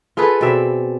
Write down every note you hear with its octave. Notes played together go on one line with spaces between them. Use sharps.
F4 G#4 A4 B4
B2 C4 D5 E5